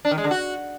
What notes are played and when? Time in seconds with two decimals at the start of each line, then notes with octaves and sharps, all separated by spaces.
0.05 D4
0.11 D#3
0.18 G#3
0.24 D3
0.31 F#4